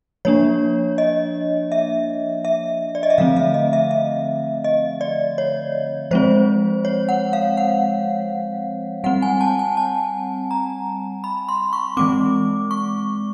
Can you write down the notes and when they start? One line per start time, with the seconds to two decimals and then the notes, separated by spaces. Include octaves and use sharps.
0.25 F3 A#3 D4 C#5
0.98 D#5
1.72 E5
2.45 E5
2.95 D5
3.03 D#5
3.10 E5
3.18 D3 F3 A3 C4 F5
3.36 E5
3.54 D#5
3.73 E5
3.91 E5
4.64 D#5
5.01 D5
5.38 C#5
6.11 F3 G#3 C4 C5
6.85 C#5
7.09 F#5
7.33 F5
7.57 F#5
9.04 G3 C4 F#5
9.22 G#5
9.41 A5
9.59 G#5
9.77 A5
10.51 A#5
11.24 B5
11.49 C6
11.73 C#6
11.97 E3 G#3 C4 D6
12.71 C#6